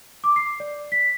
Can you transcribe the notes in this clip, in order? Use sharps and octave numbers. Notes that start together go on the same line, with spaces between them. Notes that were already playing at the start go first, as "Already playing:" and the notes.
D6
C7
D5
B6